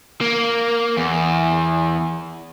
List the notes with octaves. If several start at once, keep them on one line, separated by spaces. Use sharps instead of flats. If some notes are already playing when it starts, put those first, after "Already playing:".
A#3
E2